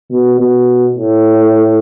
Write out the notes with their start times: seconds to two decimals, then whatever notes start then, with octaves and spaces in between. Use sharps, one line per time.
0.11 B2
0.39 B2
0.96 A2